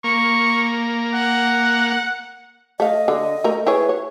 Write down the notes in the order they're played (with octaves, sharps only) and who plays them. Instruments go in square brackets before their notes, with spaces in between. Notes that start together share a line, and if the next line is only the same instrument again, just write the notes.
[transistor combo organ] A#3 [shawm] C#6
[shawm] F#5
[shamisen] A3 F5 [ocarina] D#5
[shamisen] D3
A3 A#4 A#5
[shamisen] E4 G#4 C#5 [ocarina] B4
[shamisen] C#5